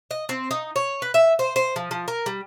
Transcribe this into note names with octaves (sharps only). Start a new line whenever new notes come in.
D#5
C4
D#4
C#5
B4
E5
C5
C5
F3
F3
A#4
G3